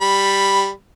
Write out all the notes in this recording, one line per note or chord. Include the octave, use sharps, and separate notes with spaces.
G3 B5